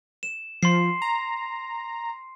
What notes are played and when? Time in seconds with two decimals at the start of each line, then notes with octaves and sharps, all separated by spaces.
0.23 E7
0.63 F3 C6 C7
1.02 A#5